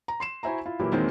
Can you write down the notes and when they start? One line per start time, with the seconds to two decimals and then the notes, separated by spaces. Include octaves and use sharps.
0.08 A#5
0.20 C6 C7 E7
0.43 E4 F#4 C5 E5 G#5 A#5
0.66 E4 F4
0.80 A#2 E3 F#3 A#3 E4 G4
0.92 E2 D#3 F#3 G#3 A#3 C4